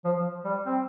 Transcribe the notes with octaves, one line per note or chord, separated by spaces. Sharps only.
F3
G3
C4